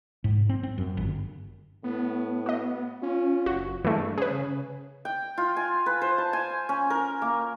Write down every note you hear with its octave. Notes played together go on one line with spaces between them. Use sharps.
G#2
C4
C4
F#2
G1
A2 B3
F#4 D#5
C#4 F4
F#1 F#4
G2 E3 G#3 A3
C#3 C#4 G#4 B4
G5
F4
G#5
B4
C5
A5
G#5
C#4
A#4
A#3